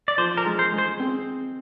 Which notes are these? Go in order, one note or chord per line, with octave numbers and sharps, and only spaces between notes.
D5
F3 C5
A#4
G#3
C5
G#3
C5
C4